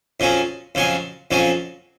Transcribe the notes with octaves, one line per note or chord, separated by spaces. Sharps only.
F2 C#3 F#3 C#4
F2 C#3 F#3 C#4
F2 C#3 F#3 C#4